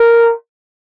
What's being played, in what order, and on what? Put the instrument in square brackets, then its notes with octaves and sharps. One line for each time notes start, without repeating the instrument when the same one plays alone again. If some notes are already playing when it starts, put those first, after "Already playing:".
Already playing: [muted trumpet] A#4